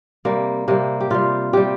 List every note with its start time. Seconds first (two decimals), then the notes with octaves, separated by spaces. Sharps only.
0.25 C3 G3 A#3
0.68 C3 G3 A#3
1.01 G4
1.11 C3 G3 F4
1.53 C3 G3 G4